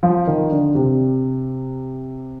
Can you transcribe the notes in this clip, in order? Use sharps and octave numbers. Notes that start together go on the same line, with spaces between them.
F3
D#3
D3
C3